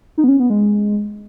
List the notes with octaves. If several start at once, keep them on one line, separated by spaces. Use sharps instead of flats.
D#4
B3
C#4
B3
G#3